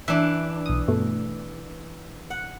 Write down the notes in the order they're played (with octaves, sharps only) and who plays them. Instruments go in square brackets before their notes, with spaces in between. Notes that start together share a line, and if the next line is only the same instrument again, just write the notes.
[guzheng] E3 D4 [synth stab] E5
[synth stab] B1 D#6
G2 B2 A3
[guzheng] F#5